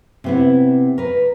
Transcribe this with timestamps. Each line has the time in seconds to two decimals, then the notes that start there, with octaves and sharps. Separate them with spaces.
0.24 C3 B3 E4
0.98 A#4 B4